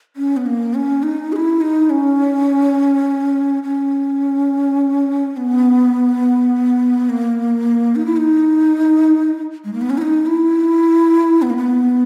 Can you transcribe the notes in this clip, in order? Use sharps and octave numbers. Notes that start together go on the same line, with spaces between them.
C#4
B3
A#3
C#4
D#4
G#4
E4
D#4
C#4
C#4
B3
A#3
D#4
E4
D#4
G#3
A#3
B3
C#4
E4
D#4
E4
B3
A#3
B3